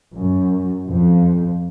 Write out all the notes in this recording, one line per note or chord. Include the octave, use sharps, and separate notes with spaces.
F#2
F2